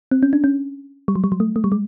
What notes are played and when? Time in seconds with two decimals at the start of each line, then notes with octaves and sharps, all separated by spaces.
0.11 C4
0.23 C#4
0.33 D4
0.44 C#4
1.08 G3
1.15 F#3
1.24 G3
1.32 F#3
1.40 A3
1.56 A3
1.64 G3
1.72 G#3